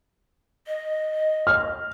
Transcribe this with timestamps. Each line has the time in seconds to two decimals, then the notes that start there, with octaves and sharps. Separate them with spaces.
0.67 D#5
1.47 F6